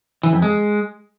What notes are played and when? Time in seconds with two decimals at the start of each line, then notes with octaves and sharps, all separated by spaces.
0.23 E3
0.33 F2
0.42 G#3